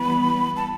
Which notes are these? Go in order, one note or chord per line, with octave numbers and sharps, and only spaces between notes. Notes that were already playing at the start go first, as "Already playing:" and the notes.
Already playing: E3 G3 B3 B5
A5